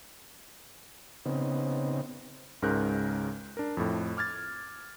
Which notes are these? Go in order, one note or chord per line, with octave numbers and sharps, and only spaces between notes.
C#3 B3 C4 D#4
C#2 G#2 C#3 A#4 F#6 G6
D4 A#4
F2 A2
D6 F6 G#6 A6